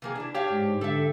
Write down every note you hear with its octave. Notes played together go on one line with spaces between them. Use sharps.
C3 A#3 G#4
D4 E4
D4 G4 C#5 F5
G#2
D3 A4 E5